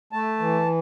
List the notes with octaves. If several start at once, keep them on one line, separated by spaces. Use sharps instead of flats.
A3 A5
E3